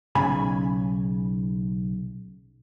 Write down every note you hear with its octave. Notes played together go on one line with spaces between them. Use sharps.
B1 C#3 G#5 B5